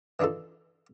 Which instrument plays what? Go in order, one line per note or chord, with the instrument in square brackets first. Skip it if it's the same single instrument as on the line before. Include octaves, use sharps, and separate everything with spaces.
[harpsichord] E3 D4 D#4 F4 A4